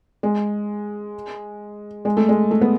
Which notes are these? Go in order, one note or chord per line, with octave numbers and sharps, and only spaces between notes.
G#3
G#3
A3
G#3
A3
B3